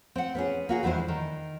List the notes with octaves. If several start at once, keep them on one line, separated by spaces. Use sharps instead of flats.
C4 F#5
B3 C#4 G#4
A#3 F#4 G#4
E2 E3 G3 D4 E4 C5
D#3